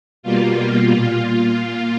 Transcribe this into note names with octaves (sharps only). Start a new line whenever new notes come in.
B2 G3 A#3 F4
F4
A#2